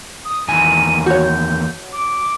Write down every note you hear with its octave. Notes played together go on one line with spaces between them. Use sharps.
D#6
E2 D#3 G#5 D#7
F#4 C#5 G6
D6